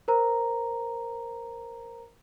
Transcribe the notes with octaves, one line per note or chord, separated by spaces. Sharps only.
A#4 C5 A#5